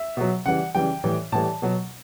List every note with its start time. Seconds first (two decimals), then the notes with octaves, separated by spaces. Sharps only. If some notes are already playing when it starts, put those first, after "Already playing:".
Already playing: E5
0.17 B2 F#3
0.45 C#3 E3 G3 F#5
0.75 C#3 E3 G3 G5
1.04 A2 E3 G3
1.32 A2 E3 G3 A5
1.62 B2 F#3